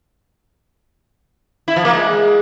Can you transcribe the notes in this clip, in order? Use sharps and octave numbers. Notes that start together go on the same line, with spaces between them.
E4
F3
A#3
G#3